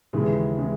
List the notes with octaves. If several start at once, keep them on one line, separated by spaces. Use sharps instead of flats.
D#2 C#3 E3 G#3
C#3 E3 G#3